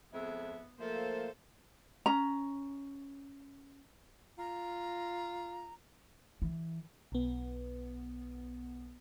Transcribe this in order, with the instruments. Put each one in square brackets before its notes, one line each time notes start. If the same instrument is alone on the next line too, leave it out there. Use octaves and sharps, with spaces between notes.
[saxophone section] F2 G#3 E5 [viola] B3
[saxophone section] F3 A3 [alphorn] A#3 [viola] A4 C5
[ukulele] C#4 A#5
[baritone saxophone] F4 [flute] A#5
[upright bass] E3
[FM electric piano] B1 B3